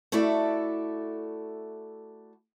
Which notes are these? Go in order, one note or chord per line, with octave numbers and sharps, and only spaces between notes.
A3 E4 F#4 A4 D5 E5